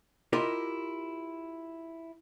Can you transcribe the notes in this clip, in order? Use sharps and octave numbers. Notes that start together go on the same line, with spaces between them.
E4 F4 G4 A#4 D#5